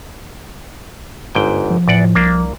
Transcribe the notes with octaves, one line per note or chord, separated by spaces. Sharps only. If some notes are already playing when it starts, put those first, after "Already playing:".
G1 G#2 G5
F3
E2 A2 D5 F#5
C2 A#3 D4